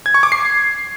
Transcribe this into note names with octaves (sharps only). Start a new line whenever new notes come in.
G#6
C#6
D6
C7